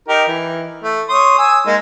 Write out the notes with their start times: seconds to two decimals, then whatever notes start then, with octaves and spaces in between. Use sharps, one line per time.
0.09 D#4 G4 A#4
0.28 E3
0.84 A3
1.09 C#5 C6 D#6
1.38 G#5 D#6 E6
1.67 G#3 A#3 D#4